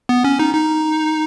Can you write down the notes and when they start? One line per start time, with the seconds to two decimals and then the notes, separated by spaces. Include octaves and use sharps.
0.09 B3
0.24 C#4
0.39 D#4
0.55 D#4